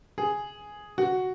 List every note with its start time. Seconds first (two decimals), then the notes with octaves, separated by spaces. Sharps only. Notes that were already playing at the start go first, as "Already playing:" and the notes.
0.18 G#4
0.98 F#4